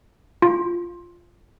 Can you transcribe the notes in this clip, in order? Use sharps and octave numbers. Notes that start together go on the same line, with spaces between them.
F4